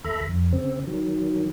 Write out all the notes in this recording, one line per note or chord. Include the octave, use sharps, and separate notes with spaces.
D#2 A4 E5 A#5 B5
F2
C#3 C4
D#3 F#3